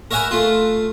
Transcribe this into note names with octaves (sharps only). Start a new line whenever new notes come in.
A#4 C#5 E5 F#5 G#5 B5
A3 F4